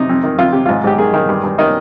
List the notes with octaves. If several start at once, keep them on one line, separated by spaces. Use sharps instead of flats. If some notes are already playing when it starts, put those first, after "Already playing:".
Already playing: C3 D#4
F2
D#3
F2 F4
C3 G4
G#2 F4
G#2 G4
D#3 G#4
D#3
G2
G2
D#3 D#5